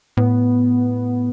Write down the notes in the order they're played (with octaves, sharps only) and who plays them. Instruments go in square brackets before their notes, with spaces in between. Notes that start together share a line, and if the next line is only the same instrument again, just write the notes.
[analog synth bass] A2 [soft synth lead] B3